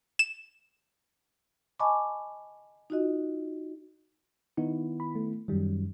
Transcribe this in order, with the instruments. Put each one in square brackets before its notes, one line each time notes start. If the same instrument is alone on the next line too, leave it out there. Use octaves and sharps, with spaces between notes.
[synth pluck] E7
[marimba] D#5 G#5 A5 B5 C#6 D6
D#4 F4 F#4 D#5
[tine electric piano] D#3 B3 E4 [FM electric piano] D#4
[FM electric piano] B5
A3
[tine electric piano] F#2 F#3 [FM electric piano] D#3 G3